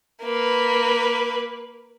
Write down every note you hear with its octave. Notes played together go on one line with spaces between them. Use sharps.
A#3 B4